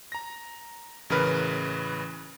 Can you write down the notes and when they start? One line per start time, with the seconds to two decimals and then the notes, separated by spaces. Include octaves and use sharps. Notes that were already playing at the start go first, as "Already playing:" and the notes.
0.12 A#5 A#6
1.10 A1 C#3 E3 A#4 B4 F6